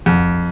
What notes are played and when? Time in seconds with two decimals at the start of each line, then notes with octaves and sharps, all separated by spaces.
0.06 F2